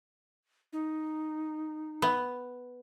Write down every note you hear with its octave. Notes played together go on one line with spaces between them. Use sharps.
D#4
B3